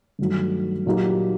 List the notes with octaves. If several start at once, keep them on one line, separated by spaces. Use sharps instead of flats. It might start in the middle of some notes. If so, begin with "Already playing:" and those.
G2 D#3 F#3 A3
A#2 F#3 A#3 D#4 G4